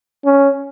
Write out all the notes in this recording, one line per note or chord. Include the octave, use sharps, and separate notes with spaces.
C#4